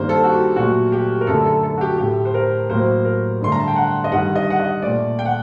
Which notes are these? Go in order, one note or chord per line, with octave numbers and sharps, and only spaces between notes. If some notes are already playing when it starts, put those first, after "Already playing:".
Already playing: G2 D#3 G3 A#3 C5
A4
F#4
G4
A#2 F#3 A3 F#4
G4
A#4
F#2 D3 A3 A4
A4
A4
F#4
G4
A2 A3 G4
C5
A#4
A2 F#3 A#3 C5
A#4
G2 D3 A3 C6
A#5
A5
G5
F#5
D#5
G2 D#3 G3 F#5
D#5
F#5
D#5
A#2 A3 D5
G5
F#5